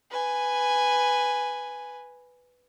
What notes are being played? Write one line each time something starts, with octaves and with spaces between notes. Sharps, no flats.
B4 G#5